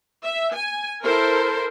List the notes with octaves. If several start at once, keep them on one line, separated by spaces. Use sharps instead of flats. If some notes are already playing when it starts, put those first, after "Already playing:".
E5
G#5
E4 A4 A#4 C5